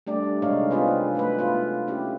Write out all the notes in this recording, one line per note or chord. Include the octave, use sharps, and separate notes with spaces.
G3 A3 D4 D5
C3 G#3 D4 D#4 C#5 F5
B3 C4 D4 F4 G#4 B4
F#3 A3 B4
B3 F4
C#4 E4 G4